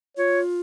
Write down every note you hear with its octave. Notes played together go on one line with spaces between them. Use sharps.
F4 C#5